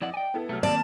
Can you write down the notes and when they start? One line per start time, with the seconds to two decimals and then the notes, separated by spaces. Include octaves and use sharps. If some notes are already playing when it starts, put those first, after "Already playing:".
0.02 F2 E4 D5 D#5 F#5
0.14 G5 G#5
0.34 B3 E4 A4
0.49 C2 F#3 A3 F6
0.63 D#3 A#3 C4 D5 A5